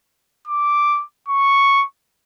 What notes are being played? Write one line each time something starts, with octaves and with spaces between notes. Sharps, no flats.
D6
C#6